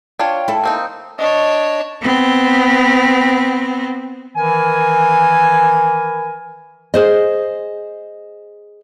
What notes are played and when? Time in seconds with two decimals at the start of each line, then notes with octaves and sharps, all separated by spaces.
0.19 D4 F4 C#5 G5
0.48 E4 A4
0.64 A#3 C4 D#4
1.19 D4 C#5 D#5
2.02 B3 C4
4.36 D#3 E3 A#4 G#5
6.94 G#4 C5 D#5